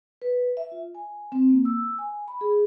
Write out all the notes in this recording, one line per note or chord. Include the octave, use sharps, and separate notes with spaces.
B4
E5
F4
G#5
C4
A#3
E6
G#5
B5
G#4